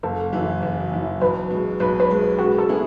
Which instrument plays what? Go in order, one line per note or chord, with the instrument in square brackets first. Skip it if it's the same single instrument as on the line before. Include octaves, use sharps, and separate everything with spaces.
[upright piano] F#1 [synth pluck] A4
[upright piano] F#2 E3
F#1
F#2 E3
[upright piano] B1 [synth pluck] B4
[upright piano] B2 G#3
[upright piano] B1 [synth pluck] B4
[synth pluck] B4
[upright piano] B2 G#3
[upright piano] C#3 [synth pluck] F#4
[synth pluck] A4
[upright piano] G#3 B3 E4 G#4